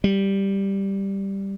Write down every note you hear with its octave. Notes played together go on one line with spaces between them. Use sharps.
G3